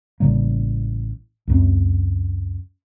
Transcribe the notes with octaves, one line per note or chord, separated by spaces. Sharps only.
A1 C#3 G3 A#3
C#2 F#2 C4